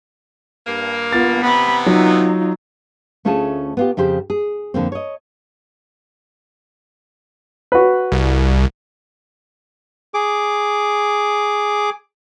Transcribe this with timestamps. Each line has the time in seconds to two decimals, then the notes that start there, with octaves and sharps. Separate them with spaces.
0.67 G2 A#3
1.13 B3 F4 A6
1.44 C3 E3 B3 B5
1.86 F#3 D#4 F4
3.25 D2 A3 C#4 F4 G#4 A5
3.77 B3 F4 G4
3.97 F2 C#3 G4 C5
4.30 G#4
4.74 F2 D3 A#3 C4
4.92 C#5 D#5
7.72 F#4 B4
8.12 C2
10.14 G#4 D6